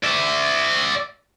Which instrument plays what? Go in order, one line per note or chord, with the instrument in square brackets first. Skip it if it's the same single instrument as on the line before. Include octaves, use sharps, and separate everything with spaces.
[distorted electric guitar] D5 E5